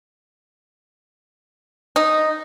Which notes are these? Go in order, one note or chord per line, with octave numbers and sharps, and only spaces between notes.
D#4